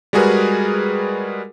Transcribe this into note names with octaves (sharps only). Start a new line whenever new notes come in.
G3 G#3 F#4 G#4 A#4 B4